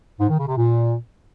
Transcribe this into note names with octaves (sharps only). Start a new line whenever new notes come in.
G#2
D#3
C#3
C3
A#2